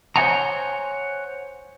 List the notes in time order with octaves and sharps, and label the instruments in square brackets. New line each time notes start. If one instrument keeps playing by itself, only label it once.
[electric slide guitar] C5 C#5 E5 F#5 G#5 A#5